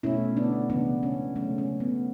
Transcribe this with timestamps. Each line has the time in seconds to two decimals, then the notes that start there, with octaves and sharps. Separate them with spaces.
0.03 B2 A3 C#4 E4
0.37 B3 D4
0.70 C#3 E3 G#3 B3 D4
1.03 C#4
1.36 C#3 F#3 A3 C#4
1.58 C#4
1.80 B3